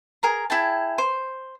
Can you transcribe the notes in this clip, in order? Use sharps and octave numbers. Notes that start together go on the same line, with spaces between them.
G#4 A#4 A#5
E4 G#4 G5 A5
C5